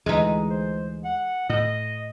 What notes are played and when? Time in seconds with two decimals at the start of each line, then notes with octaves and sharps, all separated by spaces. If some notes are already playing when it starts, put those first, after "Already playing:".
0.06 D2 E3 G#3 D#4
0.50 C5
1.05 F#5
1.49 A2 D#5